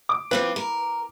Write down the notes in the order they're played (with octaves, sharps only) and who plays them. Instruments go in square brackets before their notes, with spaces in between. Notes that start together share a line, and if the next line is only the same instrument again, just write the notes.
[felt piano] D6
[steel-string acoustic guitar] F3 C4 F4 [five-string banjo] B4
[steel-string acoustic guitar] A#4